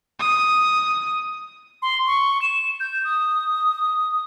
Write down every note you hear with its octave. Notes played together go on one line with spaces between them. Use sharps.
D#6
C6
C#6
E7
G6
D#6